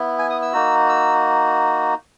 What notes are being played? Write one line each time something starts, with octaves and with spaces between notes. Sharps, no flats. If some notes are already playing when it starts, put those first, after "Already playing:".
Already playing: B3 E4
G#5
D#6
E6
A#3 D#4 F#4
E6